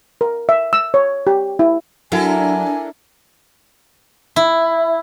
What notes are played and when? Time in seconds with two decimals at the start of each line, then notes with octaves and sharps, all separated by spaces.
0.21 A#4
0.49 E5
0.73 E6
0.94 C#5
1.27 G4
1.59 E4
2.12 F#3 D4 E4 A4 A#4 G#5
4.36 E4